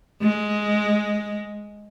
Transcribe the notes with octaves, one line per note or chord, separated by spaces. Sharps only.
G#3